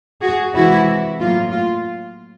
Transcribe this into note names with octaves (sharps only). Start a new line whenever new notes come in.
F#4 G#4
C3 E3 G#3 E4 F#4
A2 F#3 A#3 F4
F4